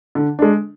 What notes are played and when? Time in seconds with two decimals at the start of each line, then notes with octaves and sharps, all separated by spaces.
0.15 D3
0.39 G#3 D4